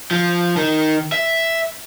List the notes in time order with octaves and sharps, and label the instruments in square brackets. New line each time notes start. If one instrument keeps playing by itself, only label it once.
[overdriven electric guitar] F3
D#3
E5